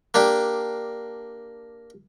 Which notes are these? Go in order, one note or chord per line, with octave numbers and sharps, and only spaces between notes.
A#3 D4 G4